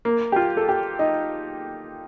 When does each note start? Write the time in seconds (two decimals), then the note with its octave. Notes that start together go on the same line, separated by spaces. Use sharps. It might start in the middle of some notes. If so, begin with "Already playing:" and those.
0.05 A#3
0.32 G4
0.36 F4
0.57 A4
0.69 G4
0.99 D#4